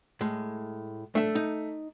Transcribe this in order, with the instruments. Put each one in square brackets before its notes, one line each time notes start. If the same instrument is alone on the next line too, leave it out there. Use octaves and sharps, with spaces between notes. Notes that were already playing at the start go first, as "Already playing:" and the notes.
[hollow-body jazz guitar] A2 G#3
[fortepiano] A3 [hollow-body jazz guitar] D4 E5
[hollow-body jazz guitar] D#4